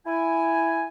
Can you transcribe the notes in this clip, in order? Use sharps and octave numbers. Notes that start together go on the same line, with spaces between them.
E4 G#5